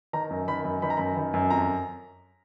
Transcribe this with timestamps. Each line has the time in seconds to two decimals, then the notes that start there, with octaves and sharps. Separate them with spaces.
0.13 D#3 A#5
0.31 F#2
0.48 D#3 B5
0.65 F#2
0.82 D#3 B5
0.90 A#5
0.97 F#2 B5
1.17 D#3
1.34 F#2
1.50 F2 A#5